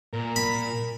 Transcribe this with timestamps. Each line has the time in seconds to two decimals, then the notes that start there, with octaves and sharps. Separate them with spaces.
0.13 A#2 A#4
0.36 B5